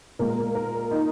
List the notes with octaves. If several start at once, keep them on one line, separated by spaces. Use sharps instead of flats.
A#2 G#3 A#4
A#4
D#4